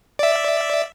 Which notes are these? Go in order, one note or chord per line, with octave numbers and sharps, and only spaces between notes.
D5 E5